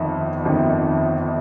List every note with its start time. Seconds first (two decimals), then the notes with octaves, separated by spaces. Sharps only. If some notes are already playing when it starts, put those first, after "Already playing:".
Already playing: G1 F2 D#3
0.45 G1 F2 D#3